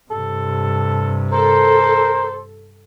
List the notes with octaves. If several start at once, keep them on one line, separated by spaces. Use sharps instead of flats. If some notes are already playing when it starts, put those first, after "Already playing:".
G2 C3 A4
A4 A#4 C5